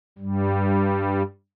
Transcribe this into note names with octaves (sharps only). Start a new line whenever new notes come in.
G2 G3